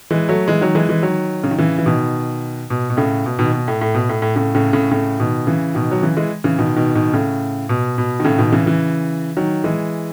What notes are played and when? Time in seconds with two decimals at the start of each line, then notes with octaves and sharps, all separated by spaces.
0.11 E3 G#3
0.29 F#3 A3
0.48 E3 G#3
0.61 D#3 F#3
0.75 E3 G#3
0.89 E3 G#3
1.03 D#3 F#3
1.44 C#3
1.51 D#3
1.58 C#3 E3
1.78 E3
1.86 B2 D#3
2.70 B2
2.90 B2
2.97 A2 C#3
3.26 B2
3.39 B2 D#3
3.53 B2
3.68 A2
3.81 A2
3.94 B2
4.09 A2
4.22 A2
4.36 A2 C#3
4.55 A2 C#3
4.73 A2 C#3
4.91 A2 C#3
5.20 B2 D#3
5.47 C#3 E3
5.75 B2 D#3
5.91 F#3
6.02 C#3 E3
6.16 E3 G#3
6.44 C#3 E3
6.59 B2 D#3
6.76 B2 D#3
6.95 B2 D#3
7.13 A2 C#3
7.69 B2
7.98 B2
8.20 D#3
8.25 A2 C#3
8.38 B2 D#3
8.52 C#3 E3
8.66 C#3 E3
9.37 D#3 F#3
9.64 E3 G#3